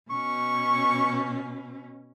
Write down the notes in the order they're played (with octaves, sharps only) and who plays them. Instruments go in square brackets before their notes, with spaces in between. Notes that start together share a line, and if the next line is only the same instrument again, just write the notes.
[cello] B2 C#4 [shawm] C#6